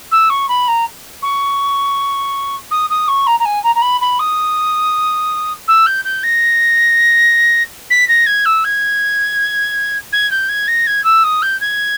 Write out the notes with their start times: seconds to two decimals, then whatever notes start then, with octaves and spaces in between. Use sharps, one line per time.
0.11 E6
0.30 C#6
0.49 B5
0.68 A#5
1.23 C#6
2.71 D#6
2.90 D#6
3.08 C#6
3.27 A#5
3.40 A#5
3.45 G#5
3.64 A#5
3.75 A#5
3.82 B5
4.01 B5
4.19 D#6
5.68 E6
5.86 G6
6.05 G6
6.23 A#6
7.90 B6
8.08 A#6
8.26 G#6
8.45 E6
8.64 G#6
10.13 G#6
10.31 G6
10.49 G#6
10.68 A#6
10.87 G#6
11.04 E6
11.24 D#6
11.42 G6
11.61 G#6